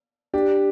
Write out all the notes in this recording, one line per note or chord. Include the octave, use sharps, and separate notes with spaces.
D4 G4